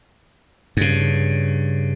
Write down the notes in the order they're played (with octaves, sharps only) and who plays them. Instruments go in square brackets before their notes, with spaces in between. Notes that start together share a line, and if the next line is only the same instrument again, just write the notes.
[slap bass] G2 C#3